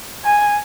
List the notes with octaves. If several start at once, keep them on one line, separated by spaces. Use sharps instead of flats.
G#5